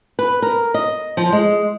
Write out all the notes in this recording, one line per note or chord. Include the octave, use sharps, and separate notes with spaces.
B4
A#4
D#5
F3
G#3